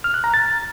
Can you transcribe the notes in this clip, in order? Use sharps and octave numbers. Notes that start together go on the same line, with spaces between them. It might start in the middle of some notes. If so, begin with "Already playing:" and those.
F6
F#6
A#5
A6